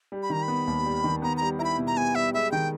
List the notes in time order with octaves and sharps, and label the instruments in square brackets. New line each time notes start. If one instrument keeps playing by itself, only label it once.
[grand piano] G3
[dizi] B5
[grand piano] D#3 [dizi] A#5
[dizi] B5
[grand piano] B3
D#2
G3
D#3
[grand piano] B3 [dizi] A#5
[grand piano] G3 [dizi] A#5
[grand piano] E4 [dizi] A#5
[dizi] B5
[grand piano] B2
[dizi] A#5
[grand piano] B3 [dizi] G#5
[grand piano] G3 [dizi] E5
[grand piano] G#3 [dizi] E5
[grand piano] D#3 [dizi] G5